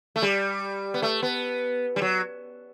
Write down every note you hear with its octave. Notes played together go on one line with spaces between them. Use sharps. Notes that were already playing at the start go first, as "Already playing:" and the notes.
A3
G3
B3
A3
B3
G3
F#3